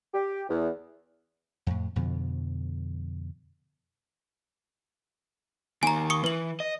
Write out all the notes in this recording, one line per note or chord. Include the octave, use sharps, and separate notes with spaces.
G4
E2
F2 A2
F2 B2 D3 F3
D#3 A#3 G#5 A#5
C#6 D#6 C#7
E3 B4 F#7
D#5